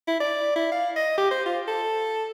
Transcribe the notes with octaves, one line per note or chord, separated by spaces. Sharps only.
E4
D5
E4
F5
D#5
G4
C5
F4
A4